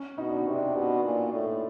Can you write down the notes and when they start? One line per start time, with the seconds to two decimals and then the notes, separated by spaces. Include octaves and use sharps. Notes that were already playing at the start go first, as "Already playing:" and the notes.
Already playing: C#4
0.18 B2 D#4
0.29 D4
0.42 C3 C#4
0.54 D4
0.75 B2
1.04 A#2
1.34 A2